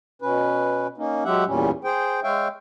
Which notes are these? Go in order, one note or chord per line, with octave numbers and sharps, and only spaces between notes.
B2 C#4 B4
A#3 C#4 D#4
F#3 G#3 G4 E5 F#5
E2 A#2 G3 C#4
G#4 C5 G5
G#3 C#5 E5 F5 G5